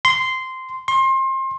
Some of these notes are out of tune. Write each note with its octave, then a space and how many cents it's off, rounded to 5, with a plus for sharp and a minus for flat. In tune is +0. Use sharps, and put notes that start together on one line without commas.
C6 -10
C6 +30